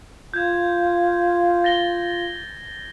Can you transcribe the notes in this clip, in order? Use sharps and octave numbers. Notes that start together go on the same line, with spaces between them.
F4 G6 G#6
A6 A#6 G7